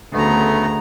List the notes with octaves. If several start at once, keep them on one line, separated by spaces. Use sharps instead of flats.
D2 C#3 A3 B3 A#5